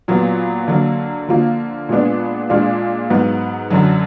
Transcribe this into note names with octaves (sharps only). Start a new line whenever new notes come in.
A#2 F#3 B3
D3 F#3 A#3
D3 F3 A#3 F4
A#2 G#3 B3 D4
A#2 G#3 D4 F4
G#2 F#3 B3
F#2 D3 F#3